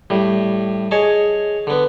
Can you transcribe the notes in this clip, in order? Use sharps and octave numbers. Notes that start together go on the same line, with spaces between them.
A2 G3
G#4 C#5 D#5 A5
D3 B3